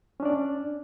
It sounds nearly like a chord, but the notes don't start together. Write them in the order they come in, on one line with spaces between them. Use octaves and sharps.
C#4 D4 D5